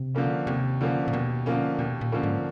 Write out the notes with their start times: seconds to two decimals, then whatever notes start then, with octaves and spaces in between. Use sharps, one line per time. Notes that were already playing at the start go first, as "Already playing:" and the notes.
Already playing: C3
0.15 D3 F3 A#3 C#4
0.47 D#2 C3
0.81 D3 F3 A#3 C#4
1.08 A#2
1.13 D#2 B2
1.46 D3 F3 A#3 C#4
1.79 D#2 B2
2.01 A#2
2.12 D3 F3 A#3 C#4
2.23 G#2